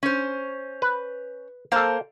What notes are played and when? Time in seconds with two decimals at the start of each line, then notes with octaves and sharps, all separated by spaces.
0.03 C#4 C5
0.82 B4
1.72 A#3 A4 C5 F5